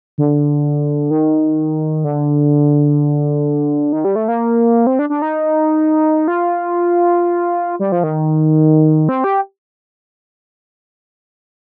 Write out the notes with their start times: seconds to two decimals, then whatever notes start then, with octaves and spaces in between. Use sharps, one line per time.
0.18 D3
1.11 D#3
2.04 D3
3.93 D#3
4.05 G3
4.16 A3
4.28 A#3
4.87 C4
4.99 D4
5.10 D4
5.22 D#4
6.28 F4
7.80 G3
7.92 F3
8.03 D#3
9.09 C4
9.24 G4